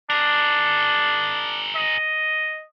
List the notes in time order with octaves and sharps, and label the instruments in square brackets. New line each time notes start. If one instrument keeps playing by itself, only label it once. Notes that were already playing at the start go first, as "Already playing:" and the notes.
[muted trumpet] D4 [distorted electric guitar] G#4 A#4
[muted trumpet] D#5